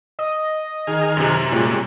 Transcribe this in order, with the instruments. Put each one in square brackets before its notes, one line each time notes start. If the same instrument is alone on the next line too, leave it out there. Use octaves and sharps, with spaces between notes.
[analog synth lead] D#5
[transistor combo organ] D#3 G#4 F6
[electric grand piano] F#2 C3
[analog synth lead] A#2 [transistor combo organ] G3 G#3 C#4